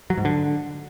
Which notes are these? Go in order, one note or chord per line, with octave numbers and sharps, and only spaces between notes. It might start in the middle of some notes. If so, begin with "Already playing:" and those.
F#3
G#2
D3